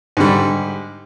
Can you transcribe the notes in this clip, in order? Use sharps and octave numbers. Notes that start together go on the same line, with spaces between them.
G#2 D3 G3